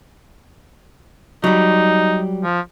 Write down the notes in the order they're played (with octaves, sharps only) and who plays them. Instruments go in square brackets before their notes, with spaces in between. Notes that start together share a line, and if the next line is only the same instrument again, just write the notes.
[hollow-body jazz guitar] F#3 G3 [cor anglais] D#4
[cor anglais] F3